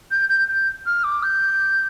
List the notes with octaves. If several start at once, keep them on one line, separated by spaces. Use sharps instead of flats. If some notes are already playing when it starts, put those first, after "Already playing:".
G6
G6
G6
F6
D6
G6